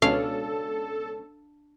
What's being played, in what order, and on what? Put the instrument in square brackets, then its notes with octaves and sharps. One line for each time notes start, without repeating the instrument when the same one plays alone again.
[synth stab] C#2 B2 C#4 [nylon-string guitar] D4 [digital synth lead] A4 [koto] F5